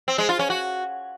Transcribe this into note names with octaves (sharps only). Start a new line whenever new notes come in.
C4
G#3
F4
C#4
F#4